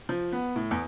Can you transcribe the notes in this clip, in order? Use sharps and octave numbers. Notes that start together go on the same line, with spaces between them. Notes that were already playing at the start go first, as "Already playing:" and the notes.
F3
B3
A2
E2